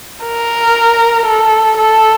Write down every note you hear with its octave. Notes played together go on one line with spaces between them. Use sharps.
A#4
A4
A4